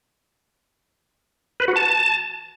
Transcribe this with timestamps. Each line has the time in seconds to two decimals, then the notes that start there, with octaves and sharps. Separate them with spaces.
1.60 B4
1.68 F#4
1.76 A5